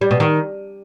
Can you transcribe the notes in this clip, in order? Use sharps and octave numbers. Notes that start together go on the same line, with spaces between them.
G3
B2
D#3